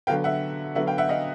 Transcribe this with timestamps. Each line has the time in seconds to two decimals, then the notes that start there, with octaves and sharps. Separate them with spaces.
0.07 D3 F#3 B3 F5 G5
0.24 E5 F#5
0.75 D3 F#3 B3 E5 F#5
0.87 F5 G5
0.98 E5 F#5
1.09 D#5 F5